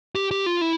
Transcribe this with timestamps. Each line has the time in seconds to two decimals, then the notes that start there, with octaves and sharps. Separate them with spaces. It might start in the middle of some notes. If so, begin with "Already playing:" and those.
0.15 G4
0.31 G4
0.46 F4
0.61 E4